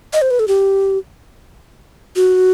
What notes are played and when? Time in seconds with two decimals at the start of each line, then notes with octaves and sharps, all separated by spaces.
0.13 D#5
0.22 C5
0.31 B4
0.39 A4
0.48 G4
2.16 F#4